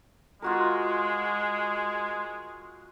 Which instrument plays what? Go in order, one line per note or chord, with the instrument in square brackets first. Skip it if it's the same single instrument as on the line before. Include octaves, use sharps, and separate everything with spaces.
[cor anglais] G#3 [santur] F4 F#4 A#4